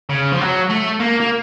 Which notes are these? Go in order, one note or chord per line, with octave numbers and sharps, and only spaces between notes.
C#3
F3
F#3
A3
A#3
A#3